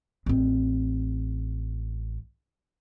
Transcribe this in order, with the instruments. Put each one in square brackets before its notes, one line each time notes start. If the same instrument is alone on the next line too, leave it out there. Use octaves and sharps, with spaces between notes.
[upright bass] A1 C4